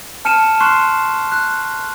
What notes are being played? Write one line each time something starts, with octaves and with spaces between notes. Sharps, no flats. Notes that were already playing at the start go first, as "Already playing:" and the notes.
A5 F6 C#7 D#7 E7
C6 C#6 F6 F#6 C7 E7
F#6